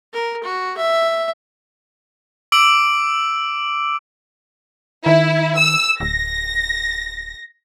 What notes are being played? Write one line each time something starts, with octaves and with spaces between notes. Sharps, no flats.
A#4
F#4
E5
D6 E6 D7 F#7
D#3 E4
E6
D1 A#6